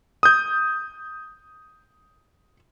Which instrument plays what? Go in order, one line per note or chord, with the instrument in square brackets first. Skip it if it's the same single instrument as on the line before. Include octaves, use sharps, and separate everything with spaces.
[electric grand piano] D#6 G6